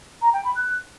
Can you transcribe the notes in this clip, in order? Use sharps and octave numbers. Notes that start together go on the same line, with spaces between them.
A#5
G5
B5
F#6